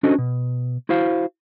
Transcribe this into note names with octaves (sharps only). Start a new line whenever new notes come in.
C#4 D4 F#4 A4 C5 D#5
B2
E4 F#4 C5 F5